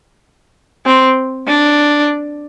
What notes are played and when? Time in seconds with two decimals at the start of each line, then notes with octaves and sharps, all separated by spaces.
0.86 C4
1.47 D4